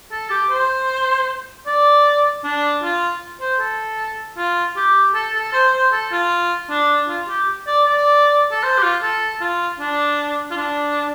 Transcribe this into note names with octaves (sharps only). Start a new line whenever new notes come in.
A4
G4
C5
D5
D4
F4
C5
A4
F4
G4
A4
A4
C5
C5
A4
F4
D4
F4
G4
D5
D5
A4
C5
G4
F4
A4
F4
D4
F4
D4